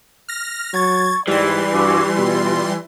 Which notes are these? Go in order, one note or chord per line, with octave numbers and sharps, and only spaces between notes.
F6 A#6
F#3 C#6 G#6 A6
G#2 E3 G3 D5 C6
G2 F#4 D6 E6
B2 F4